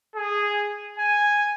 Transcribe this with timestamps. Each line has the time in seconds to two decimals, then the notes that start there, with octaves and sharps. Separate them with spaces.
0.16 G#4
0.99 G#5